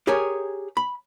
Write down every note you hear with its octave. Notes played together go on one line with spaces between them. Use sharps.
G4 G#4 A#4 C#5 G#5
B5